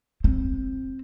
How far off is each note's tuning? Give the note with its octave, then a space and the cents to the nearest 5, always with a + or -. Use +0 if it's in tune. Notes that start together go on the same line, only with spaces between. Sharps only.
C4 +10